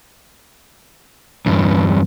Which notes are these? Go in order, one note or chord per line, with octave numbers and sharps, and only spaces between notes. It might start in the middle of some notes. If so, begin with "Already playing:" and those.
E2 G2